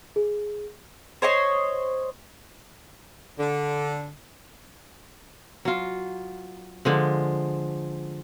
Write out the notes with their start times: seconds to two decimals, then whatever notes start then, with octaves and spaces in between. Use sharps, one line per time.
0.16 G#4
1.22 C5 C#5 D#5 C6
3.39 D3
5.65 F#3 F4
6.85 D3 F3 G#3